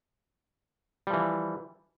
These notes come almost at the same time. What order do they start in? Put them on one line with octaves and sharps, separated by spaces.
G3 F3 E3